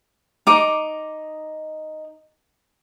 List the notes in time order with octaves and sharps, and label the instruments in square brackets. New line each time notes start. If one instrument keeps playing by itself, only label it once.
[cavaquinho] D#4 D6